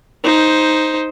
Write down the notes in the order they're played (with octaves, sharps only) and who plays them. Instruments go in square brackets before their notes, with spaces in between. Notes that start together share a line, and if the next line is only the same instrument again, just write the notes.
[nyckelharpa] D#4 C5